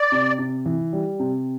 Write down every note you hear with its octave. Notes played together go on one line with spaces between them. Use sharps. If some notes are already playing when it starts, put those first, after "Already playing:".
Already playing: D5
C3
C3
E3
G3
C3